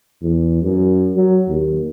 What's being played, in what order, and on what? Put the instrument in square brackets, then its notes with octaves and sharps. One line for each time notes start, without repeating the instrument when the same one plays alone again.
[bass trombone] E2
F#2
F#3
D#2